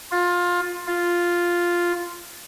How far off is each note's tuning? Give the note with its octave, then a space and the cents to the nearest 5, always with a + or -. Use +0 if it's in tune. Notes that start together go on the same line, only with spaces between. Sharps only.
F4 +20
F4 +0